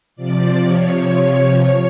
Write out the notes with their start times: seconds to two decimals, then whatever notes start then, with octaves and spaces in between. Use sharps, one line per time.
0.16 C3 F3 D5
0.64 C#5
1.59 C#5